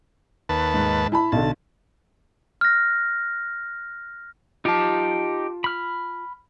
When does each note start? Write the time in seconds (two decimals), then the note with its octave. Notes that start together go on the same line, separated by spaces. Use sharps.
0.49 D#2 B4 A5
0.74 G#2
1.12 E4 A5 B5
1.32 B1 D3 A5
2.61 F6 F#6 A#6
4.65 D#4 F4 G4 A5
5.64 B5 F6